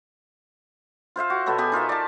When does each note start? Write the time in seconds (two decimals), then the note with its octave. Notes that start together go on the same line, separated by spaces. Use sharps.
1.16 F4 C5 E5 F5
1.30 F#4
1.46 B2 B3 A4 C#5
1.58 B3 G4 G#4 G#5
1.72 D#4 F4 A#4 E5
1.89 D5 A5